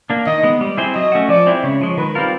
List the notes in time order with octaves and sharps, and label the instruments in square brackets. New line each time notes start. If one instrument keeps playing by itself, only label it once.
[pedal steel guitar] A#3 D4
[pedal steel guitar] D#3 [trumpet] D#5
[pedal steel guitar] G#3 B3
G3
C4 E4 G#4 C5
[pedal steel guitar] F#3 [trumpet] D#5
[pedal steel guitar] A3 C#4 F#4
[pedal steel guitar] F3 [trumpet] D5
[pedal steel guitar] G#3 C4 E4
[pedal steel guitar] C#3 [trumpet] C#5
[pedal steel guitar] F3 G#3
[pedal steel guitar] D#3 [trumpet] B4
[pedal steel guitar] G3 C4 F4 A#4